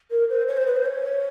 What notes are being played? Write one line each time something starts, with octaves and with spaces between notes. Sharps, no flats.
A#4
C5
C#5
C5
B4
C5
C#5